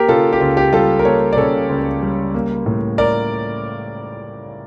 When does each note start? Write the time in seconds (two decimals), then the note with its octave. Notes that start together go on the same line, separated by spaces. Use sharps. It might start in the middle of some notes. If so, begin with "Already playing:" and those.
Already playing: A#3 G4 A#4
0.09 C#3 F4 A4
0.33 G4
0.41 C#2 F4
0.57 G4
0.73 G3 F4 A4
0.99 A#4
1.05 A#3 A4 C#5
1.33 D5
1.37 C#3 A4 C#5
1.69 C#2
2.02 G3
2.34 A#3
2.66 A2
2.98 A#4 D5